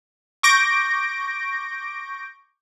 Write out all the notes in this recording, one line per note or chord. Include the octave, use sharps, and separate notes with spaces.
C#6 D6 G6 A#6 D7